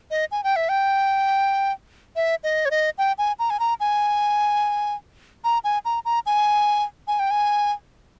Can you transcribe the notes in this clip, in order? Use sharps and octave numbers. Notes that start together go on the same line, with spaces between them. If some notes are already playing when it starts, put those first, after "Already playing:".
D#5
G#5
G5
E5
G5
E5
D#5
C#5
D#5
G5
G#5
A#5
G#5
A#5
G#5
A#5
G#5
A#5
A#5
G#5
G#5
G5
G#5